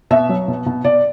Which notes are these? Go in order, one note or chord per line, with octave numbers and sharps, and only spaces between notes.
B2 E5
F#3
B2
B2
B2 D5